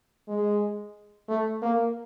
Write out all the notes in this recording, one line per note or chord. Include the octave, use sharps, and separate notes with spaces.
G#3
A3
A#3